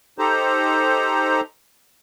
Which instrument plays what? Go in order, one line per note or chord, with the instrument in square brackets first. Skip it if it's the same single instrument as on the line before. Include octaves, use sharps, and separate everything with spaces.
[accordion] D#4 G4 A4 C5 A#5